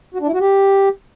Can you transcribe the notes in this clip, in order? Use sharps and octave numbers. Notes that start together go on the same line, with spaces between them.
F#4
D4
E4
F#4
G4